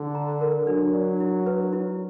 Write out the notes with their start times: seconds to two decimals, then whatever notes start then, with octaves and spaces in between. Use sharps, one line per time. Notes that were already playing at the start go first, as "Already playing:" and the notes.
Already playing: D3 D5
0.15 A#5
0.41 A#4
0.67 F#3 D4
0.94 D5
1.20 E4
1.46 B4
1.73 E4